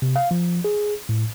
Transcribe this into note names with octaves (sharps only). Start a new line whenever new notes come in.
C3
F5
F3
G#4
A2